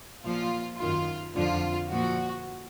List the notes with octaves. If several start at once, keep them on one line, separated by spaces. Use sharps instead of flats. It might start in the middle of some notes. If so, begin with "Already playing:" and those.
A#2 F3 F4
F#2 D#3 F4
F2 D3 F3 F4
A#2 F3 F#4